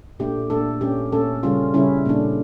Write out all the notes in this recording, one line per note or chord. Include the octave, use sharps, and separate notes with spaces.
A#2 A3 D4 G4
A#2 A3 D4 A4
A#2 A3 C#4 G4
A#2 A3 C#4 A4
C#3 G3 C#4 F4
C#3 G3 C#4 E4
A#2 A3 D4